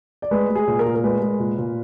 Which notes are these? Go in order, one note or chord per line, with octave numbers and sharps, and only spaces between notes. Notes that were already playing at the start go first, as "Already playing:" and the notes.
D5
G#3 B4
G#3
G#4
A#2
A#4
A#2
A#4
G#3 B4
G#3
A#2
A#2